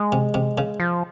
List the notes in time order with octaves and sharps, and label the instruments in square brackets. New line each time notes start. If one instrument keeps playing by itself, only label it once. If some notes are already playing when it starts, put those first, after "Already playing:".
Already playing: [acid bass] G#3
[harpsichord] C3
C3
C#3
[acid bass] F3